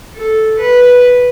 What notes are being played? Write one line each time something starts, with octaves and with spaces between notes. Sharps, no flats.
A4
B4